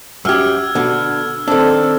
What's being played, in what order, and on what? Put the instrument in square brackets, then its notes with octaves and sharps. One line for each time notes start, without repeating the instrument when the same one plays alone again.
[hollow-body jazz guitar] F#2 G4 [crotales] E6 F6 G#6
[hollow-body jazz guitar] B2 D3
[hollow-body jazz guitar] D#3 D4 [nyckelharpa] C4 A4 [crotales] E6